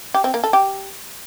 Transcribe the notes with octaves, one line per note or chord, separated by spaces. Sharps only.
G4
C4
A#3
A4
G4